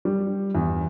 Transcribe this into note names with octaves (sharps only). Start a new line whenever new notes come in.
G3
E2